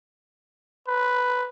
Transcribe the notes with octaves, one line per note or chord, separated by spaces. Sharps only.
B4